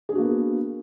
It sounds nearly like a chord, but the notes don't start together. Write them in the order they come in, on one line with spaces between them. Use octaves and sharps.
G#4 D4 F#4 A#3 B3